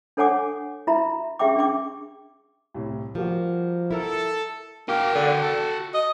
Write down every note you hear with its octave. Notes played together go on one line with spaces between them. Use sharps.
D4 A4 C#5 F#5 G#5 D6
E4 F#4 E5 A#5 B5
C#4 G4 G#4 E5 G5 D6
D4 G#4 G5 D6
C2 A2
F3 G3 A#3 F#4
E4 A4 A#4
A#3 F#4 G5
D3
A4
D#5